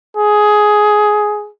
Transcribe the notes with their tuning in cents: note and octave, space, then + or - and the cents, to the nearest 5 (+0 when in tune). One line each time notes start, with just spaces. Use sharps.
G#4 +10